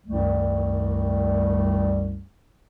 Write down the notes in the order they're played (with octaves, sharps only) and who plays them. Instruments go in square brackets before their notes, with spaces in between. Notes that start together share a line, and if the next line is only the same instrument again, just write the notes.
[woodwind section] C2 F#2 D#3 G3 A3